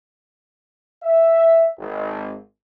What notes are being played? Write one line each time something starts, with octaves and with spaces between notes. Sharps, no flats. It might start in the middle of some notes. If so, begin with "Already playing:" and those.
E5
G#1